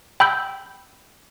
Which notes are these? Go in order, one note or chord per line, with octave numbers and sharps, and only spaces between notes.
G5 B5 E6 G6